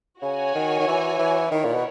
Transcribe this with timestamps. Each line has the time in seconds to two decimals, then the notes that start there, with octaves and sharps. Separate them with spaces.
0.22 C#3 F#4 C#5 G#5
0.55 D#3
0.79 D#3
0.87 E3
1.19 E3
1.51 D#3 E4 A#4 C#5
1.65 A#2
1.74 B2